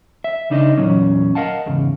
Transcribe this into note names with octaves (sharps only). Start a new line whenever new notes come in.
E5
C#2 C#3 D4 D#4 B4 D#5
E2 G2 A#2 F#3 C#4
A#4 D#5 F5 F#5 A5
E2 G#2 C#3